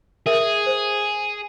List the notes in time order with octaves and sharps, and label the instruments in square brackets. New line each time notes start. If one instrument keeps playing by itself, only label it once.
[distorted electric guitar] G#4 [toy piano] A#4 E5
[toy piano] C5